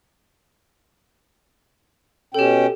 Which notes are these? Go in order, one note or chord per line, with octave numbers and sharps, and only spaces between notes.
B2 C#4 G4 A4 G5